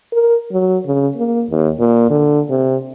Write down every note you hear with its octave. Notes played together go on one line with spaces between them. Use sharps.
A#4
F#3
C#3
A#3
D#2
A#2
D3
C3